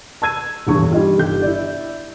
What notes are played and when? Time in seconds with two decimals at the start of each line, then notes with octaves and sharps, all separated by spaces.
0.22 A5 E6 G#6 D#7
0.67 D#1 E2 G2 C#6
0.91 G3 D#4 F4 G4
1.18 G1 G4 G6
1.42 E4 D5